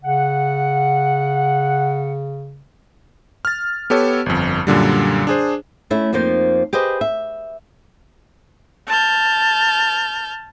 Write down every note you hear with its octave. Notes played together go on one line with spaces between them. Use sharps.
C#3 F#5
F6 A6
B3 G4 A4 C#5
G1 F2
F#2 A#2 D3 G3
D4 G#4 C5
A3 C#4 E4
F2 F3 A#3 D#4 C5
G4 G#4 B4 C5 D#5
E5
A5 F6 G6